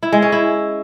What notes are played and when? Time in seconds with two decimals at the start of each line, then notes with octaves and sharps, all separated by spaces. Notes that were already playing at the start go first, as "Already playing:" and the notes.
0.03 E4
0.12 G#3
0.22 C#4
0.32 E4